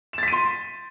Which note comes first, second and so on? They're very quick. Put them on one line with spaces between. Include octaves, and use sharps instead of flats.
E7 A6 B6 D#7 C6